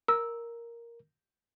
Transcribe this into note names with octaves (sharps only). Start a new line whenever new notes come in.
A#4 E6